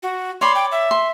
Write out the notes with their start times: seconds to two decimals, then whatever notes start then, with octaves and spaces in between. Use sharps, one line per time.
0.03 F#4
0.41 C#5 D5 B5 C6
0.55 G5
0.72 E5
0.91 C6